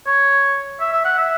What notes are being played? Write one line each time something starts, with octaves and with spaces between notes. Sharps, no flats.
C#5
E5
E5
F#5
E5